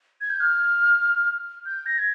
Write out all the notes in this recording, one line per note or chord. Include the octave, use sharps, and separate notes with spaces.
G#6
G6
F6
G6
A#6
G#6